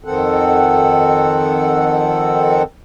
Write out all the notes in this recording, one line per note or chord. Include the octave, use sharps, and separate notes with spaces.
F2 D#3 C4 A4 F#5